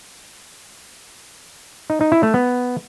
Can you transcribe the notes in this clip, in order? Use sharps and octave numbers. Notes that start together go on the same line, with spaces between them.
D#4
D#4
E4
A3
B3